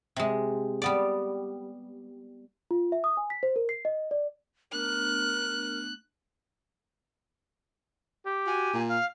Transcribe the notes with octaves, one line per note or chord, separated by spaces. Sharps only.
C3 G#3
G3 B3 D5
F4
E5
D#6
G#5
B6
C5
A#4
C7
D#5
D5
A3 B3 D4 A#4 F#6
G4
F#4 G#5
A#2
F5